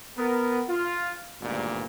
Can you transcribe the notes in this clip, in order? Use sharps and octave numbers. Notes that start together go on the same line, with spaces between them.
B3 A#4
F4
G#1 D2 G2 A#2